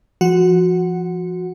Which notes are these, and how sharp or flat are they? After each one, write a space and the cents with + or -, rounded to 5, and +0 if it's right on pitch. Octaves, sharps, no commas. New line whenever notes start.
F3 -25 F#4 -20 F#5 +5